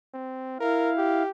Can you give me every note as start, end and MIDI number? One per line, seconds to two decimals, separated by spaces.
0.14 0.57 60
0.60 1.23 64
0.60 0.91 70
0.60 1.23 77
0.98 1.30 67